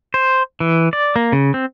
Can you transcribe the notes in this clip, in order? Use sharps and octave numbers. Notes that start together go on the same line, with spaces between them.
C5
E3
D5
A#3
C#3
C4